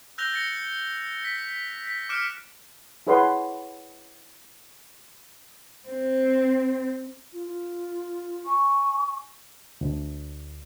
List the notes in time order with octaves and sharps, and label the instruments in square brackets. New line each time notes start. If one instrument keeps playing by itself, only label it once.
[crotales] E6 F#6 G6 A#6 F7 G7
A6 A#6 C#7 G7
B6
B6
D6 F6 F#6 C#7 D7 E7
[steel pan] E4 G#4 B4 C#5 F#5 C6
[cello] C4
[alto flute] F4
F4
[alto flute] G#5 [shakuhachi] C#6
[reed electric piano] D2